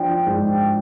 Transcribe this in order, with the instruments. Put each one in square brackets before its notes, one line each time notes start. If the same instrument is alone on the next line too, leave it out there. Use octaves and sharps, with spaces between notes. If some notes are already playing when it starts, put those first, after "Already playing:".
Already playing: [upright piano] F3 D4 [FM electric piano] G5
[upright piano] G#2